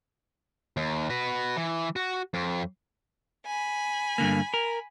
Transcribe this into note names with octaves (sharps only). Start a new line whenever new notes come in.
D#2
F#4 B4
E3
F#4
F2
G#5 B5
G2 D3 A#3
A#4